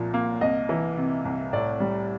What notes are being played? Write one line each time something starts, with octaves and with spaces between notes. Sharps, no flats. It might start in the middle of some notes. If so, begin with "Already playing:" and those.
Already playing: C2 A#2 F3
A#3
C2 D#5
E3
C3
C2
A2 D5
G3